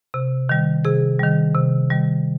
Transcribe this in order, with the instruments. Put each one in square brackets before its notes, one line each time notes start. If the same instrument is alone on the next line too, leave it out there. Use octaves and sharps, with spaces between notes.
[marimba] C3
D#3 G3
C3 G#4
D#3 G3
C3
D#3 G3